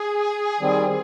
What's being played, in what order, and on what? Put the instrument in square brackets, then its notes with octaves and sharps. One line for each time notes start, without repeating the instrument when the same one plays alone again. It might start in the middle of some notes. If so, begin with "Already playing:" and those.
Already playing: [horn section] G#4
[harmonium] D#3 G3 C4